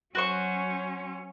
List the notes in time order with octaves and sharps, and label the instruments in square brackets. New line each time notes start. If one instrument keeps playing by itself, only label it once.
[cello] F#3 C#4 [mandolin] F#4 C5 C#6